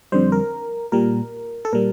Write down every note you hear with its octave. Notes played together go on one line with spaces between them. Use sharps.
F2 D3 G3 C5
A#4
A#2 G3 A#4
A4
A#2 G3 A#4